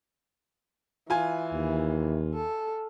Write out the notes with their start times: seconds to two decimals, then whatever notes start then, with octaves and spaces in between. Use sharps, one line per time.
1.10 E3 F4 G#5
1.52 D#2
2.34 A4